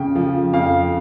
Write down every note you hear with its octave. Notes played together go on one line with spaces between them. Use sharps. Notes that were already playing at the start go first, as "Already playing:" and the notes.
Already playing: F2 C#3 G5
F3
F2 F5